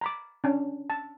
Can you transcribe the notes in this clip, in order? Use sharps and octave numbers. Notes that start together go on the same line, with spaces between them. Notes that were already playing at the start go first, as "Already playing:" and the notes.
A#5 B5 D6
C#4 D4
A5